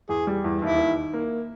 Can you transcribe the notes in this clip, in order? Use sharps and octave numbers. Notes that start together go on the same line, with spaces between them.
E2 G#4
G3
E2
D#2 E4
D#3
D#3
A#3